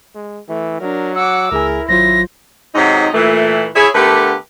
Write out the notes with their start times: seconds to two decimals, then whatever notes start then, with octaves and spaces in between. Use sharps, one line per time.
0.15 G#3
0.48 E3 A3
0.81 F#3 D4 A#4
1.15 F#5 D6 E6
1.52 C#2 E4 G#4 A#4 G#5
1.89 G#1 F#3 F4 C5 A#6
2.75 G#2 C3 F#3 D#4
3.14 A#2 E3 A3
3.75 E4 G#4 C#5
3.94 D3 A3 B3 G4 A#4 B4